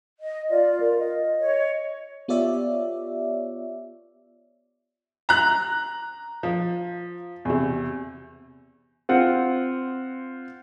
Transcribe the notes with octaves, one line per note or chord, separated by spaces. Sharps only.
D#5
F4 D5
A#4
D#5
C#5
B3 F4 G4 C#5 D5 E5
A#5 F#6
F3
E2 C3
C4 F4 F#5